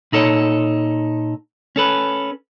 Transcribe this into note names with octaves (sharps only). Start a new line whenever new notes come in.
A#2 D#4 A4 C#5
C#4 A4 B4